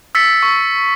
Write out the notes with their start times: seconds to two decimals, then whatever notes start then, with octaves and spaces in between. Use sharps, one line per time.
0.15 E6 A6 B6 C#7
0.43 C#6